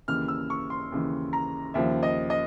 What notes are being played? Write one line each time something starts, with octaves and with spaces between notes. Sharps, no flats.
D#2 C#3 E3 F6
E6
C#6
C6
D#2 C#3 E3
A#5
D#2 C#3 F3 E5
D#5
D#5